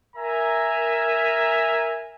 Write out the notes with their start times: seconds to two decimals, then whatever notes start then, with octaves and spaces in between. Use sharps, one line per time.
0.17 A#4 E5 G#5 A#5